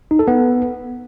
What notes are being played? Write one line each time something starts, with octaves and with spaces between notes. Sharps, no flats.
D#4
A4
B3